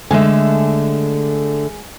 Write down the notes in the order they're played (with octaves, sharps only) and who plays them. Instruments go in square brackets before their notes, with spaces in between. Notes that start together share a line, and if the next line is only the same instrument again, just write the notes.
[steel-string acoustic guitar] D3 A3 [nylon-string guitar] G#3 G#5